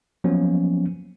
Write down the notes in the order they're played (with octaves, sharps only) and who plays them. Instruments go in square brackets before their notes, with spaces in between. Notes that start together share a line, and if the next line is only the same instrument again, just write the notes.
[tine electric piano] F3 F#3 A#3 B3 C#4